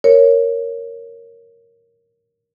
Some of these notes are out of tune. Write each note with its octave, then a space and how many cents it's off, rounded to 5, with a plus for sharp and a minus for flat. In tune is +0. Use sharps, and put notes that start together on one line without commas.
A#4 +0 C#5 +0